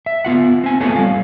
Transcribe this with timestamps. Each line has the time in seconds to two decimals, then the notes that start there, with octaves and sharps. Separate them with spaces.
0.06 E5
0.25 B3 F4 F#5
0.64 C4 G#5
0.80 A3 B3 F4 A4 C#5 G#5
0.96 G3 F5